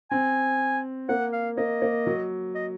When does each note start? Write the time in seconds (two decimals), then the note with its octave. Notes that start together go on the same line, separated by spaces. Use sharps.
0.11 C4 G#5
1.09 A#3 F#5
1.33 F5
1.57 A#3 D#5
1.82 A#3
2.07 F#3
2.55 D#5